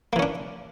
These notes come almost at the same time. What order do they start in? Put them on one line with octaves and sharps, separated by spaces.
A#3 E3 C#4 D4